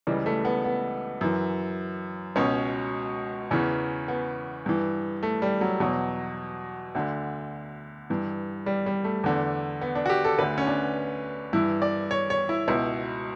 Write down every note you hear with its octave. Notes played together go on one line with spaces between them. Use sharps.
C#2 C#3 E3 G3
A3
B3
B3
F#2 E3
C#2 B2 C#4
E2 C#3 E3 C#4
B3
G2 E3
A3
G3
F#3
E2 B2 F#3
D2 D3
G2 E3
G3
G3
A3
E2 D3
B3
D4
F#4
G4
A4
D2 D3 B4
C#4
D4
G2 E3 E4
D5
C#5
C#5
E4
C#2 B2 E4